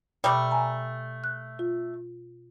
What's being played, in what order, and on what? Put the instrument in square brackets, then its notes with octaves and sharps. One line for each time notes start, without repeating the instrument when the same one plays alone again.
[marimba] B2 [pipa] G3 A3 D5
[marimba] G#5 A#5
F#6
F4